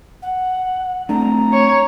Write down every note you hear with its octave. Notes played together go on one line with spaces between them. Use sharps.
F#5
A3 C4 D4 A#5
C#5